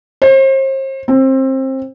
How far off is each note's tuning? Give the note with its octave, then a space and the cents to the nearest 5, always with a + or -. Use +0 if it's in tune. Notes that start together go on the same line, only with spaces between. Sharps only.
C5 +40
C4 +25